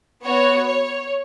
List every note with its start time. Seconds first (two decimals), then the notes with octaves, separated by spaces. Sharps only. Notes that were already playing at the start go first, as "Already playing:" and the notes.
0.23 B3 F#4 C#5
0.67 C#5